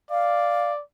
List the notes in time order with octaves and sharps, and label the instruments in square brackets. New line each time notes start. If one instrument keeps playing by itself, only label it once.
[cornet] D5 [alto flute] F5